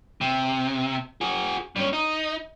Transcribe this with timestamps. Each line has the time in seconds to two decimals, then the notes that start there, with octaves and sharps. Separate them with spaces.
0.21 C3
1.21 F#4 G#4
1.76 G2 C#4
1.93 D#4